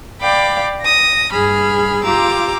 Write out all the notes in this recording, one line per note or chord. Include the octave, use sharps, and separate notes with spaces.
D5 F5 G5 B5 D6
D#6 A#6
G2 G#4 B5 F6
F4 G4 A#5 D6 E6